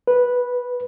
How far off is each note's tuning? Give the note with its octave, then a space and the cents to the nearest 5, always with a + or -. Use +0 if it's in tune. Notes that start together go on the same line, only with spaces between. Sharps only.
B4 -10